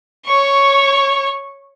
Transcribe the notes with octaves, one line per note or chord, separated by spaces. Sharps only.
C#5 C#6